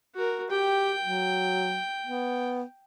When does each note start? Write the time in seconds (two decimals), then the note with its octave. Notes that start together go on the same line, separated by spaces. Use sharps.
0.15 F#4 A#4
0.51 G4 G5
1.04 F#3
2.04 B3